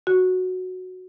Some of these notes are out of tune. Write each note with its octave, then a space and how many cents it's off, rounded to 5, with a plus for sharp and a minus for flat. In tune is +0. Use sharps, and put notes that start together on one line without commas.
F#4 -5